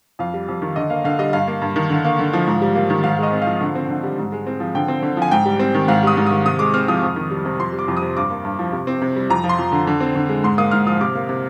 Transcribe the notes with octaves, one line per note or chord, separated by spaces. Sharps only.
F2 F5
G3
F2
D#3
D3 D#5
A#3 F5
D3 F5
G3 D#5
G2 F5
A#3
G2
D#3
D3
A#3
D3
F3
G#2
G3
A#3
D#3
G#2 F5
G#3 D#5
C4
F3 F5
D3
C4
D3
G3
G#2
G#3
C4
F3
D3 G5
C4
D3
F3 G#5
G#2 G5
G3
C4
D#3
G#2 F5
G3 D#6
G#2
D#3 D#6
C3 D#6
G#3 D6
C4 F6
F3 D#6
F2
D#3
G3
C3
F2 C6
G3
D6
F2
D#6
C3
G2 D6
A#3
G2
F3
C3
C4
C3
G3
F2 A#5
F3
C6
F2
D3
D3
C4
D3
G#3
G#2 C6
A#3 D#6
G#2 F6
F3 D#6
C3 D6
A#3
C3